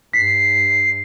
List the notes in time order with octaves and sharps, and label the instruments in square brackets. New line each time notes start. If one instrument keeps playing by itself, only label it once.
[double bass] G2 [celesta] B6 [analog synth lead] C7